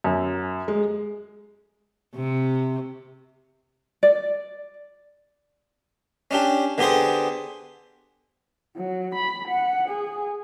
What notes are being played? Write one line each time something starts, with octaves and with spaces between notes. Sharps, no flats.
F#2
G#3
C3
D5
C#4 D4 G4
D3 B3 G4 G#4 C5
F#3
B5
F#5
G#4